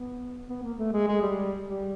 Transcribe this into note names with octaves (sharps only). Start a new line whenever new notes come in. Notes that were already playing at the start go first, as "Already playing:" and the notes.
Already playing: B3
B3
A#3
A3
G#3
G#3
G3
G3